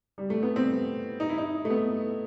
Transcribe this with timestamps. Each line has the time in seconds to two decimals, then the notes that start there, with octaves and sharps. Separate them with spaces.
0.18 G3
0.30 A3
0.43 B3
0.56 C4
1.20 D#4
1.29 E4
1.38 D#4
1.65 A3
1.70 B3